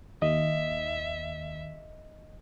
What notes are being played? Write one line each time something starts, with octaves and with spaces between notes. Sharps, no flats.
D#2 D#5 E5